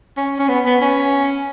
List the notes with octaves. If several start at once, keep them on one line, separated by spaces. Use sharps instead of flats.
C#4
C#4
B3
B3
C#4